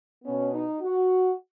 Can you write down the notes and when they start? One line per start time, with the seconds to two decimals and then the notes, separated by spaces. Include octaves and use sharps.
0.24 B2 B3 C#4
0.52 D#4
0.81 F#4